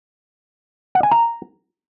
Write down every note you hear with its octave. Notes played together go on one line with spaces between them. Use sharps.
F#5
G#5
A#5